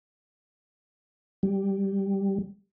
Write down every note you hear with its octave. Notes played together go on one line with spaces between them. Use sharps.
G3